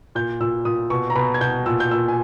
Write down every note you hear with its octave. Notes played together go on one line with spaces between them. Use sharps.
A#2 G6
A#2 E6
A#2 D#6
B2 C#6
A#5
B2 B5
G#6
B2 G6
A#2 E6
G6
A#2 E6
G#5